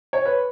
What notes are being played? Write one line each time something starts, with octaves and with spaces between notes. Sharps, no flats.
C#5
B4